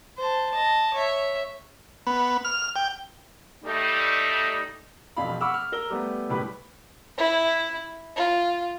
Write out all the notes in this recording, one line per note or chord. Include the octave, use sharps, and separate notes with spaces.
C5 A5
D#5 A5
C#5 E5
B3
F6
G5
G3 A3 D#4
E1 F2 F5 B5
F#5 B5 C#6 D6 E6 F6
F6
A#4 A#5 E6 G7
G3 A3 B3
F#1 A2 G3 B4 B5
E4
F4